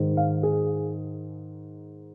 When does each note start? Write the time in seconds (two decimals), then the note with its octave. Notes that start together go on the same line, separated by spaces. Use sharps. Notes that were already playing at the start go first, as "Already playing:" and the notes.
Already playing: G#2 D#3
0.17 F5
0.43 G#4